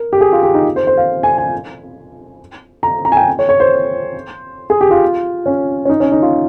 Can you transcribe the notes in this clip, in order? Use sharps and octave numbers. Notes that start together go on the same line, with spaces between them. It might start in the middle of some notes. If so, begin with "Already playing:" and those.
Already playing: A#4
G4
G#4
F4
G4
D#4
C5
C5
F5
G#5
G#5
A#5
A#5
G#5
G5
C#5
C#5
C5
G#4
G4
F4
C#4
C#4
D#4
C#4
D#4
F4